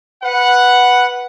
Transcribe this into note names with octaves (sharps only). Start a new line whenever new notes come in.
B4 F#5